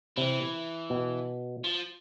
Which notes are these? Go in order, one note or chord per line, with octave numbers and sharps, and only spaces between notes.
C3 E3
B2
F3